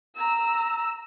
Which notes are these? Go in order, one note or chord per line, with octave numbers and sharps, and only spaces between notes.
A#5 E6